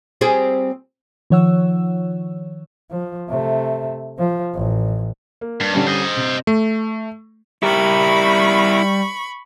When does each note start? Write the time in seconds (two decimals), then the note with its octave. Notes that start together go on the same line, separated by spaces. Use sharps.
0.21 G3 C4 G#4
1.30 D#3 F3 C#5 F#5 E6
2.91 F3
3.30 C3 A3
4.18 F3
4.55 A1
5.41 A#3
5.60 G2
5.73 D3 G3 C#4
5.87 C5 D#5
6.17 C3
6.47 A3
7.63 G3 E4 A#4 B5 C#6